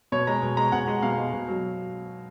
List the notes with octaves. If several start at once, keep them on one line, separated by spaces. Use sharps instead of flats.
B2 C#5
G#3 A#5
B2
G#3 A#5
B2 F#5
G#3
B2 F5
G#3
B2
F#3